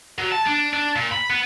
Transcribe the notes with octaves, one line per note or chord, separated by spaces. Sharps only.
F#3
A5
D4
D4
A#2
B5
B3